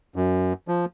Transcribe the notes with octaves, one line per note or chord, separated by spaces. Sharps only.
F#2
F3